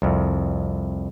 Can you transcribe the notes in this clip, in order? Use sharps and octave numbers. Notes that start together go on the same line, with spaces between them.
C2 F2